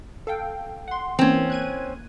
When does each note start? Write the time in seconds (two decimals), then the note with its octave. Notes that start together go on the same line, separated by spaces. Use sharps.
0.27 A4 F5 G5
0.88 F#5 C6
1.19 E3 A#3 C4 C#4
1.50 F#6 G#6 D#7